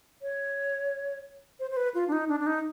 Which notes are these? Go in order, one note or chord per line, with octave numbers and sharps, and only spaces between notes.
C#5
C5
C5
B4
F4
D4
D#4
D4
D4
D#4